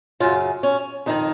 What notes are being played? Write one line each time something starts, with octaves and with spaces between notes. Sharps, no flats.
F#2 C#3 F4
C#4
F2 D#3 D#4